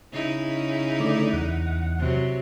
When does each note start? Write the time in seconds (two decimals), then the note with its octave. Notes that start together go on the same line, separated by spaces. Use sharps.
0.12 C#3 D#4 E4
1.00 D3 A3 D5
1.33 E2 F#5
1.99 C3 F#3